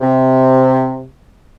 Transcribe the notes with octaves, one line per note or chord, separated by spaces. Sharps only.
C3